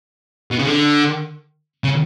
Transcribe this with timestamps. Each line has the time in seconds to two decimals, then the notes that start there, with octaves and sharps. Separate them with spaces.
0.51 B2
0.59 C#3
0.67 D3
1.84 C#3